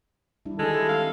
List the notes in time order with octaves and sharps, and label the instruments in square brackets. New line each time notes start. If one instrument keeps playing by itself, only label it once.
[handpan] G3 D4 E4
[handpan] D#3 E4 G4 [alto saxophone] G#3 [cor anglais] A4
[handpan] C4 [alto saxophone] F5